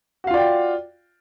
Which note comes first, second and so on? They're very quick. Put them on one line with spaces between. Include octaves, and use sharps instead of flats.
F#4 F5 F4 D5 G5